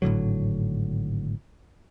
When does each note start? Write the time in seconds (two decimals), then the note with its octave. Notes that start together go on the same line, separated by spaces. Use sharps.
0.02 G#1 A2 D3 F#3